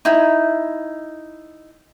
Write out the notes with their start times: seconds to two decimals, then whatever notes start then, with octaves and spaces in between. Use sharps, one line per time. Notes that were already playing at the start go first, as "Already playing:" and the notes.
0.05 D#4 E4